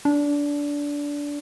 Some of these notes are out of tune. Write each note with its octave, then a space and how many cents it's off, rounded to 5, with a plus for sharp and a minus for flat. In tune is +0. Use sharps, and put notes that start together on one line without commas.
D4 -20